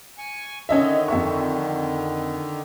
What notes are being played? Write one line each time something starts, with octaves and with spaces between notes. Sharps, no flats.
G#5 C#6
D3 D#3 C#4 D#5 E5
F2 E5 C#6